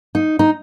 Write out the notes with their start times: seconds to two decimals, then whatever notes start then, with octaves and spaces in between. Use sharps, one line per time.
0.15 D#4
0.39 D#4